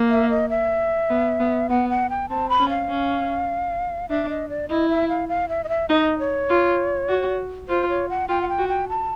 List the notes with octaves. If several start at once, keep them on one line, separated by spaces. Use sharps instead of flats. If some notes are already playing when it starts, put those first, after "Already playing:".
Already playing: A#3
E5
D#5
E5
B3
B3
B3 F#5
F#5
G5
C4 A5
B5
C#4
F5
C#4
D4 E5
D#5
D5
E4 D#5
E5
F5
F5
E5
D#5
E5
D#4 D#5
C#5
F4
F#4
F4 C5
C#5
F#5
F4 G5
F#5
G5
F#4
G5
A5